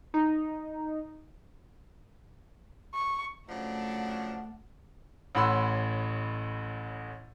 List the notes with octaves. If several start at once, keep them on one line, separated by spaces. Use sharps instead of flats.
D#4
C#6
C#3 F3 F#3 A3 D4 F#5
A1 A2 F#5 B5 C6 E6